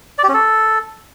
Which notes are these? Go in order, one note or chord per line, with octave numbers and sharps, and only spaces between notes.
D5
G4
C#4
A4